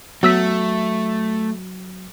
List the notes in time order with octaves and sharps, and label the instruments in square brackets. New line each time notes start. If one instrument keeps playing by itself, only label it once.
[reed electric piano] F#3 F#4 [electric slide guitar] A3 [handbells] B3 E6 B6